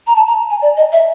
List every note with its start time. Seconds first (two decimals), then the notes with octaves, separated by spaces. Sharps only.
0.07 A#5
0.16 A5
0.27 A#5
0.50 G#5
0.62 D5
0.77 D#5
0.92 E5